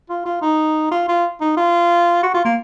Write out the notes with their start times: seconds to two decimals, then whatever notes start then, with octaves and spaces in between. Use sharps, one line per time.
0.10 F4
0.26 F4
0.42 D#4
0.91 F4
1.08 F4
1.41 D#4
1.57 F4
2.23 F#4
2.34 F4
2.45 A#3